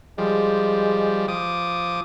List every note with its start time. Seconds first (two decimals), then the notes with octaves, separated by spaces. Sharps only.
0.18 F3 G3 G#3
1.28 F3 D6 D#6